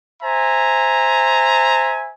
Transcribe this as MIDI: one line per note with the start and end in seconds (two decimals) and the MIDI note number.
0.23 2.12 72
0.23 2.12 76
0.23 2.12 80
0.23 2.12 82